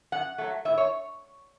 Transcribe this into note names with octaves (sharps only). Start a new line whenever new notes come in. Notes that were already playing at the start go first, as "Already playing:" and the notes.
F#2 F#5
F#3 A3
A2 E5
C#5